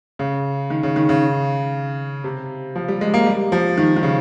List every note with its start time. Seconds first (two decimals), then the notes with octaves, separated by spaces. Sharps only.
0.19 C#3
0.70 D#3
0.83 C#3
0.96 D#3
1.09 C#3
2.24 C3
2.76 F3
2.88 G3
3.01 G#3
3.14 A#3
3.26 G3
3.52 F3
3.78 D#3
3.96 D#3
4.03 C#3